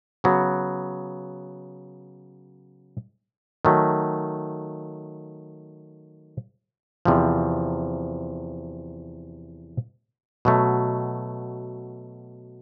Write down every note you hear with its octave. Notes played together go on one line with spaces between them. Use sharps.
C#3 F#3 B3
D#3 F#3 A3
E2 C3 F3
B2 F#3 A3